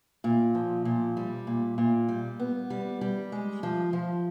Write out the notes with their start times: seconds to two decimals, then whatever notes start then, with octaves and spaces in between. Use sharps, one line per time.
0.24 A#2
0.55 F3
0.85 A#2
1.17 G3
1.47 A#2
1.78 A#2
2.09 G3
2.40 B3
2.70 G3
3.01 G3
3.32 G#3
3.63 F3
3.93 F3